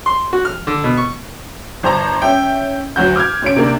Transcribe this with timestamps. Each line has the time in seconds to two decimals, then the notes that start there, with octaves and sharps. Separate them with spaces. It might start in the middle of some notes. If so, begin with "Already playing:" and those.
0.06 C6
0.33 F#4
0.45 F6
0.67 D3
0.84 B2
0.97 C#6
1.83 G1 C5 A5 A#5
2.22 C#4 E5 G5
2.96 D2 F#3 F#4 G6
3.16 D6 F6 G6 G#6
3.42 D2 C#4 D7
3.56 C3 A#3 D4